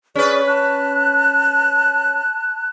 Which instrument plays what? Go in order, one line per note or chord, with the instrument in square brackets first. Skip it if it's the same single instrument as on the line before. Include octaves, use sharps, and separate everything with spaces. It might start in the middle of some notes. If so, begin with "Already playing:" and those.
[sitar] C#4 B4 [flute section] G#4 D5
[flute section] A5 F#6